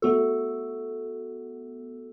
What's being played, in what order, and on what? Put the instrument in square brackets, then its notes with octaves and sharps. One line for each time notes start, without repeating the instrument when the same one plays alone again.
[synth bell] A3 B3 F#4 A4